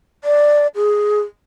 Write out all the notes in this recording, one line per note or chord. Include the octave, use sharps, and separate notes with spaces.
D5
G#4